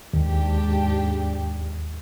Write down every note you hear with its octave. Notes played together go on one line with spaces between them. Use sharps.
D#2 G#2 D4 G4